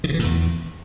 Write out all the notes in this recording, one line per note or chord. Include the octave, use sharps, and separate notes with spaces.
D#3
C3
E3
A2
E2